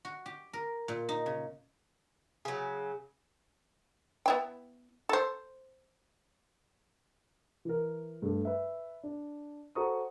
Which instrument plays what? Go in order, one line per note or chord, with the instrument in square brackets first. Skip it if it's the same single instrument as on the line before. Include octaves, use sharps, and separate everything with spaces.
[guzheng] F#4
G4
A#4
A#2
D#4
C#3
[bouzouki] C#3 F#3 [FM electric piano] G#4
[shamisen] B3 E4 G5
A4 C5
[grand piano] E3 A#4
G2 A3
B4 E5
D4
F#4 A4 C5 A#5 C#6 D#6